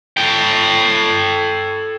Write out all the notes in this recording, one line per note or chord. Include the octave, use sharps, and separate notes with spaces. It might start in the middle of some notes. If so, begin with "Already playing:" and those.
A4 G5